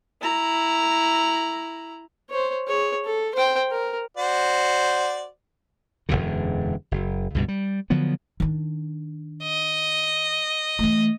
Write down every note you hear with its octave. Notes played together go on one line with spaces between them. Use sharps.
E4 A#5
C5 C#5
G#4 C#5
A4
C5 G5
A#4
F#4 C5 D5
E1 A#1 F#2 D3
F#1
C#2 G2 B2
G3
D3 F3 F#3 B3
D#3 D4
D#5
E3 A3